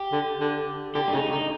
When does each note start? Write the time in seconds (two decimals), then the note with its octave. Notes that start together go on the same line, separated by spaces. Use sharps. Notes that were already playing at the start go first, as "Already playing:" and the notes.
Already playing: G4
0.12 D3
0.40 D3
0.95 D3 G4
1.08 D4
1.13 C#3 D#4
1.32 D3 D#4